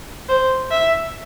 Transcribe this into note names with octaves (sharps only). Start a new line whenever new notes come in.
C5
E5